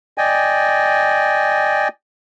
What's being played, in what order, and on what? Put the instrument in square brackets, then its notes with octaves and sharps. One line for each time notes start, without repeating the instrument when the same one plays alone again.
[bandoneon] D5 D#5 G5 G#5